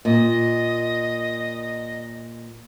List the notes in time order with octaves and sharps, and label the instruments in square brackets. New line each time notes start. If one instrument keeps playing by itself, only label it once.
[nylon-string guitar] A#2 [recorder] D#5